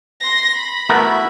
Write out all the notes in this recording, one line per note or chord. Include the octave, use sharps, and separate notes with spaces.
C6 A#6
B5
A3 B3 E4 F#4 A#4 E5